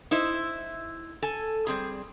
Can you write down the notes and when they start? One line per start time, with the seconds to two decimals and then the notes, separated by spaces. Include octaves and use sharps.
0.11 D#4 E4 C5 E5
1.22 A4 G#5
1.67 G3 C4 G#4